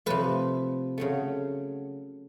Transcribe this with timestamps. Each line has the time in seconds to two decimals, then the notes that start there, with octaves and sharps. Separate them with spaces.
0.06 C3 F3 A3 B4
0.98 C#3 F#3 A3